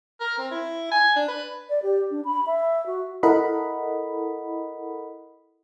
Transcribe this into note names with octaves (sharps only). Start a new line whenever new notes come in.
A#4
C4
E4
G#5
D4
B4
D5
G4
D4
B5
E5
F#4
E4 A4 A#4 D#5 F#5 B5